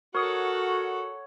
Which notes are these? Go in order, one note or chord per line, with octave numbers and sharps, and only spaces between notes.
F#4 A4 A#4 C#5 F#5 D#6 C#7